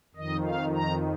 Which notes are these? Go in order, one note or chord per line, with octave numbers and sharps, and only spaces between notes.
F2 D#3 D#5
F5
A#5